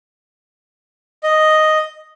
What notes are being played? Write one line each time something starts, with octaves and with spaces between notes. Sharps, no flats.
D#5